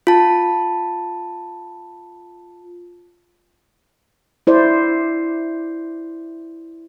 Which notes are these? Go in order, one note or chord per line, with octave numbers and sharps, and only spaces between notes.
F4 A5
E4 C5 D5